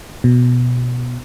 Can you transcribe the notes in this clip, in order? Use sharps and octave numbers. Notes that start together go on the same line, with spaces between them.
B2